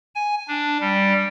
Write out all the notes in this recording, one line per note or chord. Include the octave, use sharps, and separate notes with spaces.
G#5
D4
G3